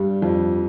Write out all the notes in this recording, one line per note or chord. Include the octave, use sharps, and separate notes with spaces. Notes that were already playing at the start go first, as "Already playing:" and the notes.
Already playing: G2 G3
F2 F3